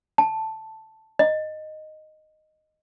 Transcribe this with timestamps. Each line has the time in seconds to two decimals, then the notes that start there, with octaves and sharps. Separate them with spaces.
0.18 A5
1.19 D#5